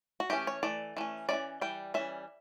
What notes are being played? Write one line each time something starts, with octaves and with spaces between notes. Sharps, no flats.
F#4
E3 A3 C#4 G4
C#5
E3 A3 D5
E3 A3 C#4
E3 A3 C#4 D5
E3 G3 G5
E3 G3 C#4 E5